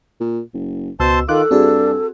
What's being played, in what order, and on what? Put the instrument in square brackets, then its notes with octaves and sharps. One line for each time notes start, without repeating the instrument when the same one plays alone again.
[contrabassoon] A#2
F#1
[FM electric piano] C#2 E6 [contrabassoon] B2 [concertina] C5 A5 C6
[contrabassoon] D#3 [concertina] F4 [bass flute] A4 [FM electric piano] D6 F#6
[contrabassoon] G2 [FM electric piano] C4 F#4 G#4 [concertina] D4